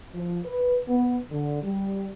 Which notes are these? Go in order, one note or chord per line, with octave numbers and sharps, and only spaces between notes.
F3
B4
B3
D3
G3